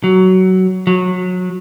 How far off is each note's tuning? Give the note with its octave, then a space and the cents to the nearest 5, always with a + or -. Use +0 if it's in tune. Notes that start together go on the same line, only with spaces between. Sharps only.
F#3 +15
F#3 -25